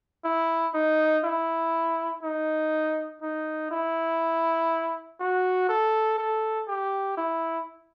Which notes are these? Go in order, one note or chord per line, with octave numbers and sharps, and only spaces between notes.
E4
D#4
E4
D#4
D#4
E4
F#4
A4
A4
G4
E4